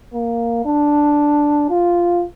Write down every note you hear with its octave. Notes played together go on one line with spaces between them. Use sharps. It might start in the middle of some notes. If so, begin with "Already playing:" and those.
A#3
D4
F4